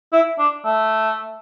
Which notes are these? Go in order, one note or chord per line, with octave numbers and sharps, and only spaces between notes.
E4
D4
A3